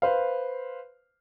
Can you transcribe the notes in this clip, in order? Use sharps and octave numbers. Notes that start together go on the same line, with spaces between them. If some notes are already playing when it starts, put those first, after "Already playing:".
B4 C5 F5